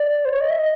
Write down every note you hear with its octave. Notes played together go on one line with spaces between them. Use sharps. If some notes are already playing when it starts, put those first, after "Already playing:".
Already playing: D5
C5
C#5
D#5
E5
D#5